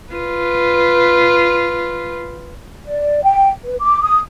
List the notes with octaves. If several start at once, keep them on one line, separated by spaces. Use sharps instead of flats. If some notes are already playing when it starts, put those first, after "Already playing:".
F4 B4
D5
G5
B4
D6
D#6